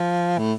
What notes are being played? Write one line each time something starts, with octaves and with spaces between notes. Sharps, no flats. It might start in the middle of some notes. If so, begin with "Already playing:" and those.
Already playing: F3
A2